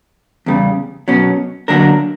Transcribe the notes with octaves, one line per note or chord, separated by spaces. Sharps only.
E2 C#3 G3
B2 F#3 C#4
D3 F#3 A#3 D4 A#4